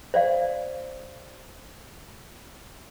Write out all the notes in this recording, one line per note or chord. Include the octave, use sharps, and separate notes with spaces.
C5 D5 F5